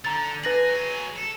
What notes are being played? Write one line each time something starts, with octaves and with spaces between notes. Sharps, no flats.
D3 A#5 A6
G#4 B4 A#6 F#7
F#3 G#4
A4